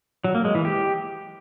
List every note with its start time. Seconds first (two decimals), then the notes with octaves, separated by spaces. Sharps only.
0.24 F#3
0.35 A#3
0.45 G#3
0.55 E3
0.65 G4